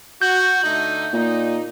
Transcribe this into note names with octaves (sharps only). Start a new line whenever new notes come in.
F#4 G6
D3 A3 D#4
A#2 D#4